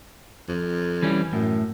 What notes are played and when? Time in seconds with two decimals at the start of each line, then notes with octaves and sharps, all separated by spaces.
0.48 F2
1.02 E3 G3 C#4
1.33 F#2 A2